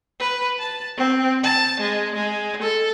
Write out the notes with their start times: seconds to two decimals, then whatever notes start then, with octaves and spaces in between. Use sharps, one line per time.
0.20 B4
0.59 A5
0.97 C4
1.44 A5
1.80 G#3
2.15 G#3
2.63 A4